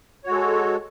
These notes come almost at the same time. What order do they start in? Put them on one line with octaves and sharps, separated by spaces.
C#5 F#4 G#3 A4